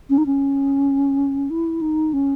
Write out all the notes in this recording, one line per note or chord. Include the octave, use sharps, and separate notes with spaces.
C#4
D#4
C#4
E4
D#4
C#4